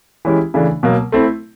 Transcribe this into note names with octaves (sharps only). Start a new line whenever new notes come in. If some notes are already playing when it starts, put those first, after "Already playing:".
E3 G#3 C#4 E4 G4
C#3 E3 A3 D4
B2 F#3 A#3
A3 C4 E4